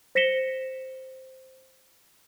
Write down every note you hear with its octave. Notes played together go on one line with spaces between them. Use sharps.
C5 A#6 B6 C#7 E7 G7